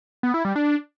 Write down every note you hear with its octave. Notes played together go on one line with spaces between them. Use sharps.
B3
E4
G3
D4